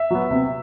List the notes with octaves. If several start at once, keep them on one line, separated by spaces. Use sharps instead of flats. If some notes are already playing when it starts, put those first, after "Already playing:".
Already playing: E5
F#3 B3
C3